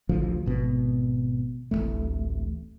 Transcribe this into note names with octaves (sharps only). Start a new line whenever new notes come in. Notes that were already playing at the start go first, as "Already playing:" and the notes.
A1 D2 F3
G#1 B2
D1 A1 F#2 A3